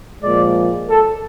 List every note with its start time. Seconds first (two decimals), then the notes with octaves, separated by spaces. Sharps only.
0.22 A#2 F3 G#3 D5
0.89 A4